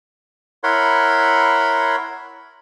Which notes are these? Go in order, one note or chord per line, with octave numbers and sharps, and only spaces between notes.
E4 A#4 C#5 F#5 B5 C6